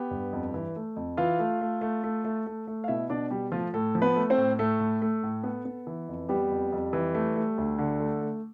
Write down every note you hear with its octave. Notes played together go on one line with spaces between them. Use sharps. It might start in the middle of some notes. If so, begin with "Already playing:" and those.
Already playing: B3 G4
G2
F2
E3
A3
F2
E3 F4 F5
A3
A3
A3
A3
A3
A3
A3
F5
B2 E4 E5
B2 D4 D5
B2 G3 G4
F3 A3 F4
A2 A3 A4
F3
B3 B4
A3
C4 C5
A2
A2 A3 A4
A2
A3
A2
B3
B3
E3
F2
G3 B3 G4
F2
F2
E3
A3
A3
D2
D3
A3
A3